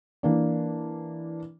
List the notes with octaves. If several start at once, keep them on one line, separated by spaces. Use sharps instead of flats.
E3 A#3 D4